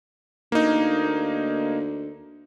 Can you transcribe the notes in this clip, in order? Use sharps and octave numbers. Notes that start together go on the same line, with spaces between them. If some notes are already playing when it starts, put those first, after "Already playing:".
D2 A#3 D#4